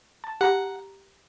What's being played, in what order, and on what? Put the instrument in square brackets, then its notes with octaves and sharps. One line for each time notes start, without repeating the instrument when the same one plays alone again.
[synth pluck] A5
[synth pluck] G4 A#5 [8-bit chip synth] F#5